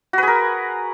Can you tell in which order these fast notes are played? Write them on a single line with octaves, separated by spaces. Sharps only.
F#4 B4 G#4 A#4